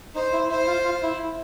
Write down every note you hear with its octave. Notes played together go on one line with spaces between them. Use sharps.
D#4 C5
E4
E4 C5
F4
F4
E4